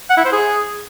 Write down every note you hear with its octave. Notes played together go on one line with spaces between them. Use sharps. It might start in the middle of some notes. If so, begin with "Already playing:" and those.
F#5
E4
C5
G#4